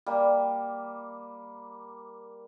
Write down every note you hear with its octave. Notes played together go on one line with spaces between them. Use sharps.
G3 A#3